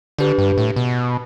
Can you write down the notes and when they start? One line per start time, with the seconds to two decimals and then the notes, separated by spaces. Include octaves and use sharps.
0.18 D3 D4 G4 B4
0.38 G2
0.57 A2
0.76 B2